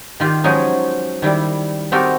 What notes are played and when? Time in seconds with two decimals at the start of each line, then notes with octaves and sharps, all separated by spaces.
0.20 D#3 F4 G4
0.44 F3 F#3 G#3 C#4 D#4
1.22 D#3 G3 E4
1.92 C4 D#4 F#4 G4 A4 A#4